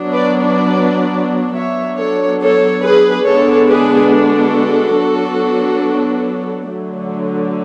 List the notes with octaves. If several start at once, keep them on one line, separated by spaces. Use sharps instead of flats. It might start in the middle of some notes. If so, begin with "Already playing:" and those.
Already playing: F#3 B3 D4
B4 D5
B4 D5
F#3 B3 D4 C#5 E5
A4 C#5
A4 C#5
G#4 B4
D3 G#3 B3 D4 A4 C#5
G#4 B4
F#4 A4
F#3 B3 D4
D3 F#3 A3